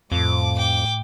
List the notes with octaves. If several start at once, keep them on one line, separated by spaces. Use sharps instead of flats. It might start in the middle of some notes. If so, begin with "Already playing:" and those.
F2 A2 D6
G5 D6